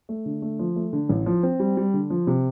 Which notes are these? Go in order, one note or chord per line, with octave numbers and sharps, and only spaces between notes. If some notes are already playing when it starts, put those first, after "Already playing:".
A3
D3
A3
F3
A3
D3
A1
F3
C4
G3
G3
D3
F3
C3